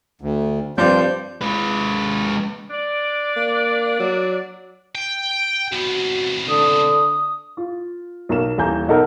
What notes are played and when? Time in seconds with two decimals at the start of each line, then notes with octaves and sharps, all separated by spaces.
0.21 D2
0.78 G2 F3 C4 C5 D5 G6
1.42 G#3 B4
2.70 D4 D5
3.36 A#3
4.00 F#3
4.95 G5
5.72 C2 B3 F#4
6.48 D3 D#6
7.57 F4
8.29 B1 A#4 E7
8.58 D#1 E3 G#5 A#5 G6
8.88 B1 B3 D#4 A4 A#4 F#5